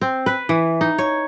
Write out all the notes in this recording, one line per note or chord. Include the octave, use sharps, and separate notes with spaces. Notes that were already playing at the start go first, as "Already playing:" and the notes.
C4
B4
E3
D#4
C#5